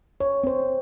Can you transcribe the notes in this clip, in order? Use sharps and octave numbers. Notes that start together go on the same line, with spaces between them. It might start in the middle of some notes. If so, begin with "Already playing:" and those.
C#5
C4 C5